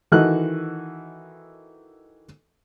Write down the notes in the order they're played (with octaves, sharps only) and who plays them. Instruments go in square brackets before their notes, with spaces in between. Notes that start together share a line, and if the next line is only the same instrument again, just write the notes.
[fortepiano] D#3 E3 F#4 A4 D#5 F#6